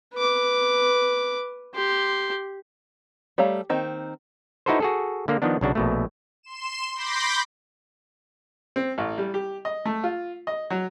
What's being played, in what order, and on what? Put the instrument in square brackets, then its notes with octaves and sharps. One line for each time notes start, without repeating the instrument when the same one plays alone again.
[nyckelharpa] B4 D6
G4 C6
[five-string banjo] G3 A3 C#5 F5 A#5
D#3 A#3 C4 D#4
[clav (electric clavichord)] D#4 E4 F#4 A4 B4 C5
F#4 G#4 A4
D3 A#3
D#3 F3 B3 D4
B1 C#3 D4 F#4
A#1 B2 A3
[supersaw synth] C6 E7
B5 C6 D6 G6 A#6
[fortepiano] C4
A1
G3
G4
D#5
A3
F4
D#5
F#3